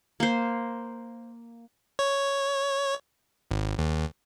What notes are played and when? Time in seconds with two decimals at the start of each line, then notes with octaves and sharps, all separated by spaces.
0.20 A#3 C5
1.99 C#5
3.51 G#1
3.78 D#2